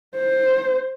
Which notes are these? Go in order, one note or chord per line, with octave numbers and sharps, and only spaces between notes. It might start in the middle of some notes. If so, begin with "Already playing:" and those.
C5